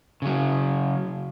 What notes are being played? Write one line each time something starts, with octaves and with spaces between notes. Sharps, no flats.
C#3 F#3